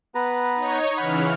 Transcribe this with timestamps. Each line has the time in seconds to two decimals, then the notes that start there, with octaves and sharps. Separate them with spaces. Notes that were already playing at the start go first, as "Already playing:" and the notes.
0.15 B3 B4 A#5
0.55 D#4 C#5
0.97 C#3 E3 F#5 B5 F6